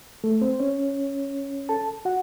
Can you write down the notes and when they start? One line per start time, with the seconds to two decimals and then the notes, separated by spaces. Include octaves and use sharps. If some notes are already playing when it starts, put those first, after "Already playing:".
0.24 A3 A4
0.41 C4 C5
0.60 C#4 C#5
1.69 A4 A5
2.05 F#4 F#5